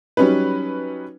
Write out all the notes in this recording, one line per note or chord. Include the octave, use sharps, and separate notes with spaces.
F#3 G3 C#4 D#4 B4